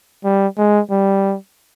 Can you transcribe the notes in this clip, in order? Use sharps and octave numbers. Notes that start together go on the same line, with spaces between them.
G3
G#3
G3